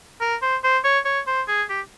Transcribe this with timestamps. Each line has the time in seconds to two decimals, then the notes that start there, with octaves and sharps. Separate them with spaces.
0.21 A#4
0.42 C5
0.64 C5
0.84 C#5
1.05 C#5
1.27 C5
1.48 G#4
1.70 G4